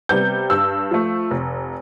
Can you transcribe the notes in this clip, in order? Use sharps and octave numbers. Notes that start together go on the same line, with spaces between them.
C3 G3 B3 G6
G2 E6
F3 A3
F1